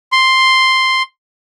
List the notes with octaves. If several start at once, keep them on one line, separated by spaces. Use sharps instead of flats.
C6